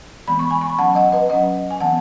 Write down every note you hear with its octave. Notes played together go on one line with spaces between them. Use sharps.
E3 G#3 B3 B5
C#6
G#5 B5
C#6
B5
F#3 C#4 F#5 A5
D#5 F#5
B4 D#5
F#3 C#4 D#5 F#5
G#5
E3 B3 F#5 A5